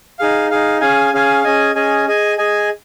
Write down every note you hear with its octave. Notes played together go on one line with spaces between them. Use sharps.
D#4 G#4 F5
D#4 G#4 F5
C#4 G#4 F5 G#5
C#4 G#4 F5 G#5
C#4 G#4 D#5 G#5
C#4 G#4 D#5 G#5
G#4 D#5 G#5
G#4 D#5 G#5